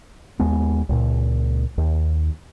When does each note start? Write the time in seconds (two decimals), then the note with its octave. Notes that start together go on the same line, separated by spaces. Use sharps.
0.39 D#2 G#3 B3
0.89 C#2 A#2
1.78 D#2